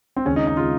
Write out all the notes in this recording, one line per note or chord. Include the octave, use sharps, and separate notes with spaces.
C4
D#2 C#3 G#3 C#4
D#4
D#4
C#3 G#3 F4